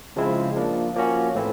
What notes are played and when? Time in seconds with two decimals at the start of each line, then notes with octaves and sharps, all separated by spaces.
0.16 C#3 F3 G#3 C4 E4
0.56 F3 A#3 D4
0.95 F3 A#3 C#4 F#4
1.35 A2 E3 A3 C4 E4